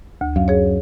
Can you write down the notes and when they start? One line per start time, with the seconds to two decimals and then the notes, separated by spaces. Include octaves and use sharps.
0.21 D2
0.36 F#2 F5
0.48 G#4 C#5